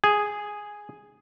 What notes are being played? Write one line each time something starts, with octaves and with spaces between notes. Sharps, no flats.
G#4